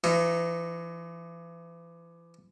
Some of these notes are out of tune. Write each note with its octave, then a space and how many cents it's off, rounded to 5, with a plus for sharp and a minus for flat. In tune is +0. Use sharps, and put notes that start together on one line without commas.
E3 +40 D#4 +0